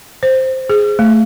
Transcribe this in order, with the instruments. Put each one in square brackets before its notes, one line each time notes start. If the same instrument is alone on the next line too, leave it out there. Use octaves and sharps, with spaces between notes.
[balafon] C5
G#4
A3